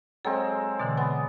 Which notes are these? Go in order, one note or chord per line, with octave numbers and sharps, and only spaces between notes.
F#3 G#3 C4 A4
B2 D3 E3 D5
B3 G#5 D#6